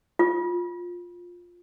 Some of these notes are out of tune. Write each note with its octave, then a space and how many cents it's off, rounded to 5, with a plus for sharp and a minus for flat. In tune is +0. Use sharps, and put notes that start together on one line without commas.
F4 +15